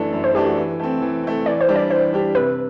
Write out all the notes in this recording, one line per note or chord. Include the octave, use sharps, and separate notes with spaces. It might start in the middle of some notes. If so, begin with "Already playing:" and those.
Already playing: F#2 E3 A3 D4
F#2
C5
E3 A3 D4 G4
F#4
E3
A3 C4
E3
A3 C4
E3 D5
C5
G3 D4 G4
D5
E3 C5
G3 D4 G4
C3 B4